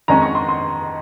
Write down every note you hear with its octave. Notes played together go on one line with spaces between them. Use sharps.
F2 D#3 G#3 C#4 A#5
C#6
C6
C6